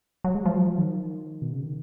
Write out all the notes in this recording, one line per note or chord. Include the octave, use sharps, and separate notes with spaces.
F#3
G#3
F3
F#3
F3
D#3
B2
C#3
D#3